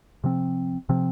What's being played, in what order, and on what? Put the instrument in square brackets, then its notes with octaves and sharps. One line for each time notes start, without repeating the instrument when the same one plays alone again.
[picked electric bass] C3 F3 C4
C3 F3 C4